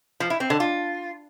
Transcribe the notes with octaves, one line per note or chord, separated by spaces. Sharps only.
F3
E4
C4
D3
F4